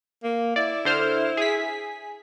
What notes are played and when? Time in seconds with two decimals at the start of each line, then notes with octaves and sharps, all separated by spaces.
0.24 A#3
0.56 E4 D5
0.85 D3 C5 F6
1.37 G#4 B6